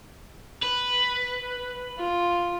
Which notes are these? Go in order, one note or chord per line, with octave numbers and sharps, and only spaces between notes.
B4
F4